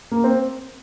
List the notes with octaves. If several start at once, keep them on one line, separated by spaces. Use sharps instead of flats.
A#3
C4